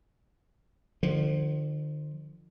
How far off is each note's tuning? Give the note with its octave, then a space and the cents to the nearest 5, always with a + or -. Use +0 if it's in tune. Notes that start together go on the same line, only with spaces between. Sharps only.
D3 +40 F3 +0